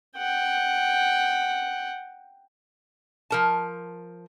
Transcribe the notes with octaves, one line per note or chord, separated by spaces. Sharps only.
F#5 G5
F3 A#4 A5